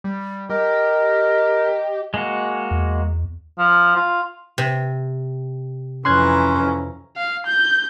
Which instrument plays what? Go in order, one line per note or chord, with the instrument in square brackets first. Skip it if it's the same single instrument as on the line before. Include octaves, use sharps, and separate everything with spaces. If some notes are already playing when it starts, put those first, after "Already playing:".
[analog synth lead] G3
[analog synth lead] G4 [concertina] A#4 [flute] D#5
[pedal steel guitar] G#3 A#3 F#4
[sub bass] E2
[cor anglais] F3
F4
[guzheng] C3
[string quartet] F2 E3 A#5 [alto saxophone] C#4 [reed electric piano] C6 F#6 G#6
[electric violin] F5
G6